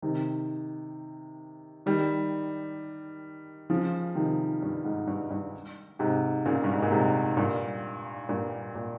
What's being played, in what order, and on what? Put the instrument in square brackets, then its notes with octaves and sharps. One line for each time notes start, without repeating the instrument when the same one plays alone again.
[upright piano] C3 D#3
D#3 G3
C#3 F3
C3 D#3
G2
G#2
G2
G2
G#2 C3
A#2 C#3
G2
G#2
A#2
G#2 C3
G2 A#2
G2 A#2
A#2